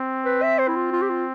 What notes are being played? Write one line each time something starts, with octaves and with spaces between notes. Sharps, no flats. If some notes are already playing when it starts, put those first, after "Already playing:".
Already playing: C4
B4
E5
C5
E4
F4
F4
G4
F4